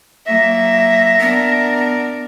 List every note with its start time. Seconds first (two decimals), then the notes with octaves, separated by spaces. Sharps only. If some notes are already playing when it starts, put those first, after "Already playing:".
0.27 F#3 A#3 E5 A#6
1.20 B3 D4 A#4